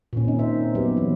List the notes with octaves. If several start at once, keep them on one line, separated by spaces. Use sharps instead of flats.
A#2 D#3 C#4
C4 D#4
C5 E5
F#3 B3 G4
E3